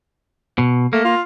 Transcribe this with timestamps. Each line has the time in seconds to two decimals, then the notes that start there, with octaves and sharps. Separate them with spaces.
0.58 B2
0.93 A3 A#3
1.05 F4